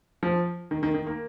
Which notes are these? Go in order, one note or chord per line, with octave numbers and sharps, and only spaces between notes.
F3
D#3
D#3
D#3
A#3